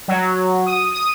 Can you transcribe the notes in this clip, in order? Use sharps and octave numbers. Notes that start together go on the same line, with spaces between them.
F#3
D#6
D#6